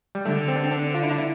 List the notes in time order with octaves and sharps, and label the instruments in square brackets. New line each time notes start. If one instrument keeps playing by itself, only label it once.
[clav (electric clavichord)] G3
[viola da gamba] D3 [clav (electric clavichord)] A3
[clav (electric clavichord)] C4
D4
C4
D4
F4
E4
D4
E4